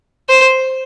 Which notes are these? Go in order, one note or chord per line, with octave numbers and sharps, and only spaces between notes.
C5